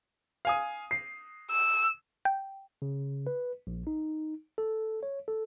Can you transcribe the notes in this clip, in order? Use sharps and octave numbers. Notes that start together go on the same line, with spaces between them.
F5 G#5 D#6
C7
E6
G5
C#3
B4
A#1
D#4
A4
C#5
A4